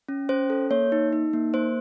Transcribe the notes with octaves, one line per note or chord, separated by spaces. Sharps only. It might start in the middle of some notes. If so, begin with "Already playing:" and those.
C#4
C#4 C5
A4
A#3 C#5
D#4
D#4
A#3
A#3 C5